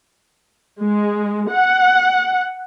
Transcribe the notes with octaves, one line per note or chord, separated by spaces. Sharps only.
G#3
F#5